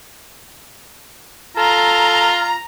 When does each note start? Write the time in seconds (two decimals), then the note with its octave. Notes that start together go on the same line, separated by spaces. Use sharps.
1.57 F4 A4 A#5